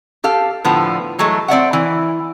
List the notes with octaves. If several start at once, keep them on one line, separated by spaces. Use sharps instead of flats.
G4 A4 F5
A2 D3 F3 B3
E3 F#3 G#3 A3
C4 D5 E5 F#5
E3